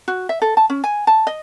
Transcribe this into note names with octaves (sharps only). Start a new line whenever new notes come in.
F#4
E5
A4
A5
C#4
G#5
A5
D#5